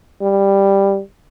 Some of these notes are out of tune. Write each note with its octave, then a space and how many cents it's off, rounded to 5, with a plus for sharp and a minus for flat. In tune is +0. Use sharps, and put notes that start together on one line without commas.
G3 +5